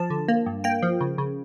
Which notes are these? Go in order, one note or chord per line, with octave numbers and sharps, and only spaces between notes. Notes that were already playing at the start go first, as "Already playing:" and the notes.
Already playing: F3 A5
D3
A#3
G2
A#3 G5
F3
C#3
C#3